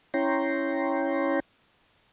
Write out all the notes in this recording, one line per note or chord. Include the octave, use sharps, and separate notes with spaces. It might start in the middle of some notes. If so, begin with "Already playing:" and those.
C#4 E4 C#5 G5 A#5 C6